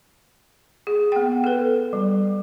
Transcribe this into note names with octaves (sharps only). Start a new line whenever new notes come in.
G#4
B3 G5
A4 B4
G3